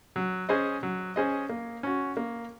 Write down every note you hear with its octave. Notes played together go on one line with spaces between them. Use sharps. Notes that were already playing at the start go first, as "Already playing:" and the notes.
F#3
C#4 G#4 C5 D#5
F#3
C#4 G#4 C5 D#5
A#3
C#4 F#4
A#3